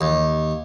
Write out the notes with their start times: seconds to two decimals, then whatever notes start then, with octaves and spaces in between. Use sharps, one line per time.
0.01 D#2